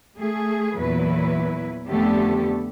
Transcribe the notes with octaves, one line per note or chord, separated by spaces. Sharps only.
A3 G#4
E2 A#2 F#3 E4 B4
F2 D3 A3 B3 G4 A4